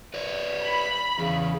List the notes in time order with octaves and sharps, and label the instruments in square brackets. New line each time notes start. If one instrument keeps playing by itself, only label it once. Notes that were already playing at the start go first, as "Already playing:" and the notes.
[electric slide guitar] B4 C#5 D5
[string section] B5
[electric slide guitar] E2 [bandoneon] C#3